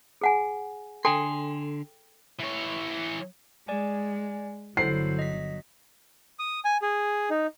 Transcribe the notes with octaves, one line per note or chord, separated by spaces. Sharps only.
G#4 F#5 G#5
D3 A4 G5 G#5 C6
E3 C#5
G#3 D5 G#5
G1 D3 F#3 E4 A4 C5 C7
D#5 B6
D#6
G#5
G#4
D#4